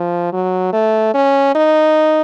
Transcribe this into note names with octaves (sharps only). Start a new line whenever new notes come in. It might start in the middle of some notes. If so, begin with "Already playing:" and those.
Already playing: F3
F#3
A3
C#4
D#4